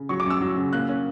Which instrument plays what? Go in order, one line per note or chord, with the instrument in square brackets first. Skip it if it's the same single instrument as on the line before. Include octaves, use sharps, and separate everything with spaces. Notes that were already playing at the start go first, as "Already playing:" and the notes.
Already playing: [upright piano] C#3
[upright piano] F#3 [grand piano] C#6
[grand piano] D6
[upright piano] F#2 [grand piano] E6
[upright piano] F#3
C#3
[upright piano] A#3 [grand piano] F#6
[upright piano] C#4